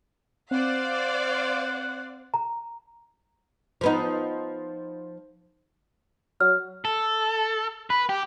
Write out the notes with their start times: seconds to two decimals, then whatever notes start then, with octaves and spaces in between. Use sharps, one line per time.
0.51 C4 C5 D5 F5 F#5
2.34 A#5
3.81 F3 B3 D#4
6.40 F#3 F6
6.85 A4
7.90 B4
8.09 G4